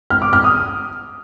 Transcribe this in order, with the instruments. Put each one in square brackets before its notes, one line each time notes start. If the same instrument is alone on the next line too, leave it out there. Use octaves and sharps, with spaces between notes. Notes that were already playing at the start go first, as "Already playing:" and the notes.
[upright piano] F6
D6
F6
D#6